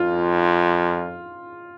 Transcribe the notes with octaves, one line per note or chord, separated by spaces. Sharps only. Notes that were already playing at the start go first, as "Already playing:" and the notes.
Already playing: F2 F4